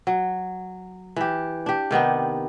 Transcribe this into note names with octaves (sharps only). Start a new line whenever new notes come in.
F#3
E3 G4
D4 G4
C3 D#3 B3 D4